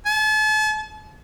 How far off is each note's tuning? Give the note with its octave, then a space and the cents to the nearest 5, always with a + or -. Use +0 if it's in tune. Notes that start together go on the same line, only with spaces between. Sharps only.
A5 -40